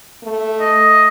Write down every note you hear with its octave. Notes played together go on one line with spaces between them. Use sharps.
A3
D#5